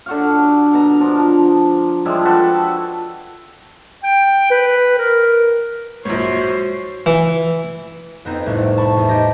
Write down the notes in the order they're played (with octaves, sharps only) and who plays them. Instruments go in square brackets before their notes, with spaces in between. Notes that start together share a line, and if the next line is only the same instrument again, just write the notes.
[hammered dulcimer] D3 F#4 F5
B2 A#5
F3 D4
F3 G3 G#3 E4
F#4 A4 B4 G5
[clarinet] G5
B4
A#4
[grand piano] A#1 G#2 [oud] B2 F#3 F#4 [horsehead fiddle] C5 [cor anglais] C#5
[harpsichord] E3
[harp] F2 B3 C4 D#4
C2 A2 A3
A5 B5 C#6
E2
D#4 G4 D#5